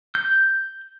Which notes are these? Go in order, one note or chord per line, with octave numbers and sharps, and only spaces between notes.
G6